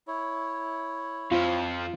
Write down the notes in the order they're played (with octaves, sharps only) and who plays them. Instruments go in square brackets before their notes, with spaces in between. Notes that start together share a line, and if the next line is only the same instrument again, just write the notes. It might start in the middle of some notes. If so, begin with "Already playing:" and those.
[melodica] E4 C#5
[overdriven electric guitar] F2 F3 [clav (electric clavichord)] F4